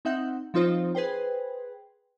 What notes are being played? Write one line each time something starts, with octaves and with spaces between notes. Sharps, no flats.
C4 D#4 E5 F#5 G6
F3 C4 D#4 F4 C5 C#5
G#4 B4 C5 G5